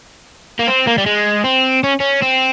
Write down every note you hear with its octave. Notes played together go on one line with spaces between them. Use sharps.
A#3
C4
A#3
G3
G#3
C4
C#4
C#4
C4